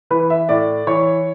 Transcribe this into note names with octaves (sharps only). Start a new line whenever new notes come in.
E3 B4
E5
A2 D5
E3 C#5